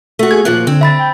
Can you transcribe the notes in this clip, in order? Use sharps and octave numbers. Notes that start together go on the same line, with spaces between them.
A3 F#4
G#4 G#6
D#2 A#2 F3 F#6
D3 C4
E5 B5 A6
G5